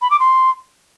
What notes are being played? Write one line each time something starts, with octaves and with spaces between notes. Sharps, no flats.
B5
D6
C6